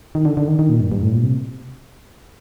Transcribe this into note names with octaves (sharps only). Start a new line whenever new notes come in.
D#3
D3
D3
D#3
D#3
A#2
G2
G2
A2
A#2
C3